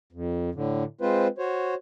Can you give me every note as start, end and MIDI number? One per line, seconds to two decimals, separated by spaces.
0.13 0.50 41
0.55 0.84 45
0.55 0.84 50
1.01 1.27 56
1.01 1.27 60
1.01 1.27 65
1.01 1.27 71
1.01 1.27 72
1.38 1.74 66
1.38 1.74 72
1.38 1.74 73